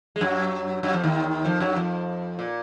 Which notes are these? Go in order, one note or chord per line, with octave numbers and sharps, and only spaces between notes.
G#3
F#2 F#3
F#2 F#3
F2 F3
D#2 D#3
F2 F3
F#2 F#3
F2 F3
A#2